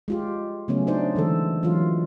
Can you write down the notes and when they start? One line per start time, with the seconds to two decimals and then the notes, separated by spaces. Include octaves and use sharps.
0.08 G#3 F4 G4
0.68 C#3 F#3 A3 B3 C#4
0.87 D4 D#4 C5 D5
1.15 D3 E3 G#3 A4
1.63 E3 F#3 G#3 F4